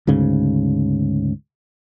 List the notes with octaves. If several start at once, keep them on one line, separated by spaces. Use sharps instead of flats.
D2 G#2 C#3